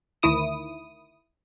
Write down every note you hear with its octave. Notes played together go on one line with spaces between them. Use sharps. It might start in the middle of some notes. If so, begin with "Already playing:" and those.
D2 D#3 E4 D#6 D#7